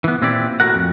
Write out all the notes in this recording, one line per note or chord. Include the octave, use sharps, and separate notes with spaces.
E3 B3
A#2 C4 E4 G4 D5
A2 F#4 A#4 F#5
F2